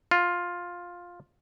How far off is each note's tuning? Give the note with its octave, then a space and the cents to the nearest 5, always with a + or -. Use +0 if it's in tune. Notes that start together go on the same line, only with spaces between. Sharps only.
F4 +10